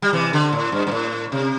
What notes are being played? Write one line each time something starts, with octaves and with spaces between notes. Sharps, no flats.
G3
C3 E3
D3
A2
G2
G2
A2
C3